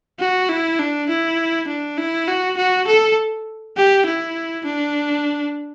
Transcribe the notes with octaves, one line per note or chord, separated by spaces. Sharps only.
F#4
E4
D4
E4
D4
E4
F#4
F#4
A4
G4
E4
D4